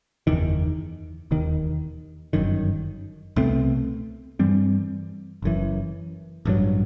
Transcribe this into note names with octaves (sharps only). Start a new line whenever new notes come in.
F#1 E2 D#3
E1 D#2 D#3
G1 F#2 D#3
C2 B2 A3 C4
G2 E3 G3 C4
F#1 F#2 E3
A1 G2 F#3